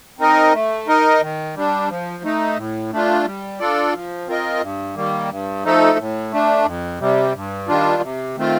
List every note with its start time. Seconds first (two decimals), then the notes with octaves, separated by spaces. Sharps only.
0.19 C4 D#4 A#4 D#5
0.54 A3
0.88 D#4 A#4 D#5
1.21 D#3
1.56 G3 D4
1.89 F3
2.23 A3 D#4
2.57 A2
2.92 A3 D4 F4
3.25 G3
3.59 D4 F4 A4 D5
3.94 F3
4.27 C4 F4 A#4 D#5
4.61 G2
4.95 D#3 G3 A#3
5.30 G2
5.64 F3 A3 D#4 A4
5.98 A2
6.32 A3 D4
6.65 F2
7.00 C3 G3
7.34 G2
7.68 D#3 G3 D4 F4
8.02 C3
8.37 D#3 A3 C4 F4